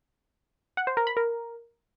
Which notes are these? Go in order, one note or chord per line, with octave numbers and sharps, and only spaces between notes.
F#5
C5
A#4
B5
A#4